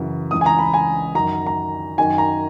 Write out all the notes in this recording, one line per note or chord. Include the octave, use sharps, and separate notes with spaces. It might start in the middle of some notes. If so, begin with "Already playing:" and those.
Already playing: F#2 C#3 E3
C#2 C#3 E3 D#6
G#5
A#5
B5
G#5
F#2 D#3 A#5
A#5
F#2 D#3 G#5
A#5